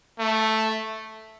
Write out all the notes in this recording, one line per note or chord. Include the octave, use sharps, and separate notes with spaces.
A3